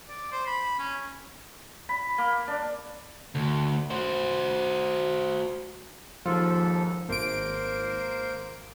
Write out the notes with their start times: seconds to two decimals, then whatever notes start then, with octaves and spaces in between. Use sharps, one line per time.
0.09 D5
0.32 C5
0.47 B5
0.79 C#4
1.89 B5
2.18 A#3
2.48 D4
3.35 D2
3.91 F#4 C5
6.26 D#2 G#2 F3 A4
7.09 G#1 A#3 A#4 C5 D7